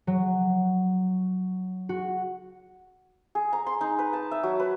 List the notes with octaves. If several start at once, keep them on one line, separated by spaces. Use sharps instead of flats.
F#3
F#4
G#4
A#5
C6
D#4
B4
A5
E5
F#3
B4